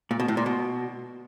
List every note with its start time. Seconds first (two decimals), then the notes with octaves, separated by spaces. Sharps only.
0.11 A#2
0.20 B2
0.28 A2
0.37 A#2
0.46 B2